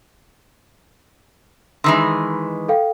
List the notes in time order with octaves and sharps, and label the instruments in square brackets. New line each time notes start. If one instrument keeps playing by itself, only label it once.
[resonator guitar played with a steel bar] D#3 E3 G#3 [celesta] C6 E6
[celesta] A4 F5 G5